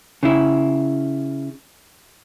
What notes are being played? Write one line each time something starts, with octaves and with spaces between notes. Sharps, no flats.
C#3 E4